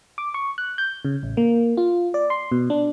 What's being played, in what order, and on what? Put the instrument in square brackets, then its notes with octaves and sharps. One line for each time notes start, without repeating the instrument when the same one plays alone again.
[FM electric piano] D6
C#6
F#6
G6
C#3
A1
A#3
F4
D5
C6
B2
D4